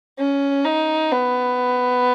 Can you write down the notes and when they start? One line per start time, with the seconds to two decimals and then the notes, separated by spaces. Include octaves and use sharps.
0.18 C#4
0.65 D#4
1.12 B3